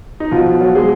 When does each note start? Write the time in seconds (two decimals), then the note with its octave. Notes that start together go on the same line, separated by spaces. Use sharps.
0.20 D#4
0.31 B2 F3 F4
0.45 B2
0.60 F3 F#3 F4
0.75 F#3 G#3 G#4